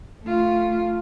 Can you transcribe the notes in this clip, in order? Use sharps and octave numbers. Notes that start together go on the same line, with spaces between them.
A3 F4